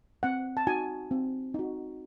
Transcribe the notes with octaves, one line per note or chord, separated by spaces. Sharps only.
C4 F#5
A5
D#4 F#4 G#5
C4
D#4 F#4